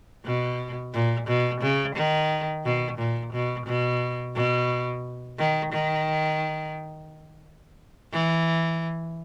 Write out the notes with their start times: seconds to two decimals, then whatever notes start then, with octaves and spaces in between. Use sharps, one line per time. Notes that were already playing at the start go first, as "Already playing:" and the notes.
0.24 B2
0.93 A#2
1.27 B2
1.61 C#3
1.96 D#3
2.64 B2
2.98 A#2
3.33 B2
3.67 B2
4.35 B2
5.38 D#3
5.73 D#3
8.12 E3